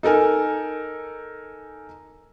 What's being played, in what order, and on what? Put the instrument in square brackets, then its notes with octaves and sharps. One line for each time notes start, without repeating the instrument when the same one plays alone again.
[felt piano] D#4 A4 A#4 G#5